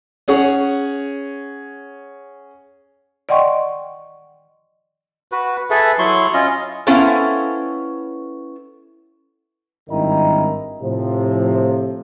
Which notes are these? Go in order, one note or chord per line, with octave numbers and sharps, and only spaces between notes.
C#4 G#4 C#5 F#5
D5 D#5 F#5 G5 C6 C#6
F#4 B4
G#4 A4 B4 E5
F#3 E4 C6 C#6
C#4 F4 D#5
B3 C#4 E4 A4 C5 F5
G#1 G2 D#3 E4 D#5 A#5
A2 C3 F3